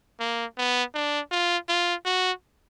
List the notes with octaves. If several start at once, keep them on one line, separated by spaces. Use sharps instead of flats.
A#3
B3
D4
F4
F4
F#4